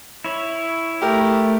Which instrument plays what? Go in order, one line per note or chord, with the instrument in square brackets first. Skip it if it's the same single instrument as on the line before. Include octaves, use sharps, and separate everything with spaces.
[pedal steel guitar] E4 C#5
[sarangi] A3 [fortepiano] G4 A#4